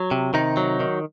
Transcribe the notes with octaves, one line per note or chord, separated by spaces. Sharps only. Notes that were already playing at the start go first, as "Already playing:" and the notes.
Already playing: F#3
C3
C3 D#3 D#4
F#3
D#3